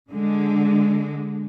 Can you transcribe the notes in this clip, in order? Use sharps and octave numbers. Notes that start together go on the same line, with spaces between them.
D3 G#3